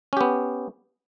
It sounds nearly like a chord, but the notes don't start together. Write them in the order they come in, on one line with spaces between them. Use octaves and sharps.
C#4 G4 B3